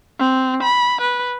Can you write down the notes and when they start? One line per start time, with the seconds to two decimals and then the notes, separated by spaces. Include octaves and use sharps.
0.19 C4
0.63 B5
1.01 B4